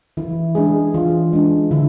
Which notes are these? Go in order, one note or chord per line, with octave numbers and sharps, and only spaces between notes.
E3 E4
G#3 D4 G#4
E3 F4
G#3 D4
D3 E4